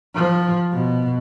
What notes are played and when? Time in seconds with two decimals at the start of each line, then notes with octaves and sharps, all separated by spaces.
0.15 F3
0.73 B2